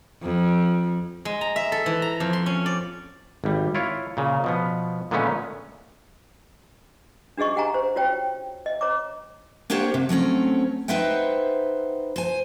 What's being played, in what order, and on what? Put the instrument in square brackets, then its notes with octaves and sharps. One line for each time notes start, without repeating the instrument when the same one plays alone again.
[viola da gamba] F2
[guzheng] G#3
A#5
E5
A4
E3
A#5
F2
C6
C#4
D5
[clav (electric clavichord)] G#1 G3
E4 F4 C#5
A#2 C#3
B2 F3 B3
A#2 D3 G#3 A3 B3 C#4
[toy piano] D4 F#4 G#4 D#5 C#6
G4 F#5 G#5 A#5
C5
F4 F#4 C#5 G5
D#5
C#5 A#5 D6
[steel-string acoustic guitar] A#3 D4 G4 C5 C#5 F#5
C3
F#3 A3 C4 C#4
D#4 B4 C5 E5 F#5 G5
C5 G#5